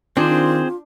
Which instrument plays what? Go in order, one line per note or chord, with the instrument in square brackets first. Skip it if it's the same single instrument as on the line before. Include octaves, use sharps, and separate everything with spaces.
[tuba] D#3 [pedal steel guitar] C4 G#4 C5 [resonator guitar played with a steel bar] D4 [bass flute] F4